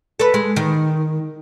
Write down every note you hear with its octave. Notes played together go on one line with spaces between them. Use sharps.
A4 B4
G#3
D#3